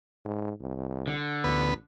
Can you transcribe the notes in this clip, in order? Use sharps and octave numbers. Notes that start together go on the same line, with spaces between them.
G#2
C2
D3
A1 D2 B3 B4